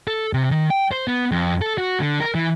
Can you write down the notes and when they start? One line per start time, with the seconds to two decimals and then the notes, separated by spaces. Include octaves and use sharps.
0.07 A4
0.33 C3
0.51 D#3
0.70 G5
0.91 C5
1.08 B3
1.32 F2
1.62 A4
1.78 F#4
2.00 D3
2.20 A#4
2.35 E3